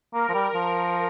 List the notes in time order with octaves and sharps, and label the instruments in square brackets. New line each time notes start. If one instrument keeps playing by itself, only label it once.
[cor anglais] A#3 [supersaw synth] A#4
[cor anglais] F3
G3
F3